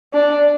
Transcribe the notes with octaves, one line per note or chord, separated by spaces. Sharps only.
D4